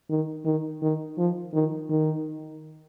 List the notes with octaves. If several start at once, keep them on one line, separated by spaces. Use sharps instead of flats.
D#3
D#3
D#3
F3
D#3
D#3